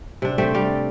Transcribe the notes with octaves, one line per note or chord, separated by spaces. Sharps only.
C3 D4
A3 C4 G4 C5
G3 D5 F5